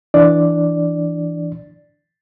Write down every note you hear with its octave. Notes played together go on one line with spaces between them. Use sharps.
E3 D4 D5